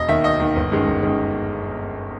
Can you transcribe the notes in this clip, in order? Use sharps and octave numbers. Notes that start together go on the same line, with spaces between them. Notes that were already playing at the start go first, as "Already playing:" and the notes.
Already playing: E1 D#5
D#2 D#3 E5
E1 D#5
D#2 D#3
G1
F#2 D#3 G#3
G1
F#2 D#3 G#3